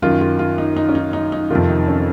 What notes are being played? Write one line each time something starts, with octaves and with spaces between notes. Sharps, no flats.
F#2 D#3 F4
F4
F4
D#4
D#4
C#4
D#4
D#4
D#4
F2 C3 D#3 F4
D#4
C#4